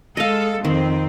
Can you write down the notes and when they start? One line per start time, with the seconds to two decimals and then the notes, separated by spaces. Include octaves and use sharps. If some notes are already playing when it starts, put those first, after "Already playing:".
0.17 G#3 A4 D#5 F5
0.65 F2 D#3 C4